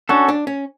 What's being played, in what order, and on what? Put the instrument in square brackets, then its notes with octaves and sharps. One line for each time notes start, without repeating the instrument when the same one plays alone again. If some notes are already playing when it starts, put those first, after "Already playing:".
[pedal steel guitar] C#4 F#4 A4 [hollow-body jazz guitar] D4
[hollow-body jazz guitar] D4
C#4